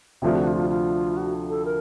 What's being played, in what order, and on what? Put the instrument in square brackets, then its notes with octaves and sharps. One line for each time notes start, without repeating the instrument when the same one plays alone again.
[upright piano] D2 C3 F3 A3 D4 [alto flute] F4
[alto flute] F#4
F4
F4
F#4
A4
A#4